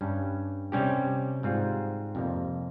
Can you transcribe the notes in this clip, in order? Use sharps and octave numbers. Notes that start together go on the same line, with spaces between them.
G2 G3 C#4
C3 G3 C#4 G4
G#2 G3 C4 F4
F2 C3 G3 A#3